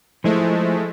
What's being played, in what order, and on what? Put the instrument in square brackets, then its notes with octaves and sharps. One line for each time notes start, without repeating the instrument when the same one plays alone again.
[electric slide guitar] F3 E4 C5 [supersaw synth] G#3 A3